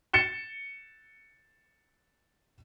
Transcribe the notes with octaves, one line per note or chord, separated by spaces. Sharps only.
A6 C#7 E7 G7